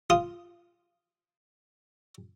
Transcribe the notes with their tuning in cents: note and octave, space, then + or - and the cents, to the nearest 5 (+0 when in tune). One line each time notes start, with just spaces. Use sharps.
F4 -5 D#6 +0